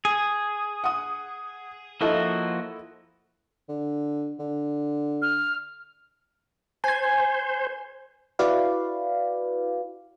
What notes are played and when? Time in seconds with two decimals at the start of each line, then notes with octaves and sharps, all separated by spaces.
0.05 G#4
0.84 F#5 D#6
2.01 F3 A#3 E4 F#4 A4 D#5
3.69 D3
4.39 D3
5.22 F6
6.84 C5 G#5 G#6
8.39 E4 F#4 B4 D5 F5